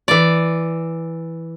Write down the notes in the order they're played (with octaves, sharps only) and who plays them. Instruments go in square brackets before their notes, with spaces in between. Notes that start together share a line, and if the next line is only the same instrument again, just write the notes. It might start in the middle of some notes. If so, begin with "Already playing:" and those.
[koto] E3 D5